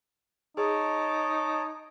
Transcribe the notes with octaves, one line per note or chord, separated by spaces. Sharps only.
D#4 G#4 C#5 A5 D6